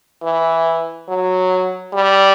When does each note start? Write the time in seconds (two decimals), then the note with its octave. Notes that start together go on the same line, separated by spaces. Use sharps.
0.23 E3
1.09 F#3
1.93 G3